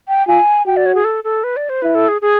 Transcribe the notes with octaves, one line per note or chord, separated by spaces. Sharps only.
G5
F4 G#5
F#4 G5
D5
C#5
G#4
A4
A4
B4
D5
C5
E4 B4
A4
G#4
G#4